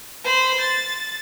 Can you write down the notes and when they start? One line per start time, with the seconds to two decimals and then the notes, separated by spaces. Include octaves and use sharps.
0.24 C5 B5
0.61 A6